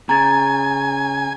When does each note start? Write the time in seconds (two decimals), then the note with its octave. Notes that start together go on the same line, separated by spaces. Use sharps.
0.09 C#3 G#5 A#5 G#6 A6